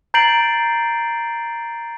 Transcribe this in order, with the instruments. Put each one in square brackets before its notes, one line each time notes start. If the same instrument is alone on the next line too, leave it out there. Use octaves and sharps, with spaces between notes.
[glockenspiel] A#5 G6 A6 C7 D7 F#7